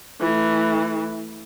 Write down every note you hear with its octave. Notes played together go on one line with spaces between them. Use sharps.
E3 A3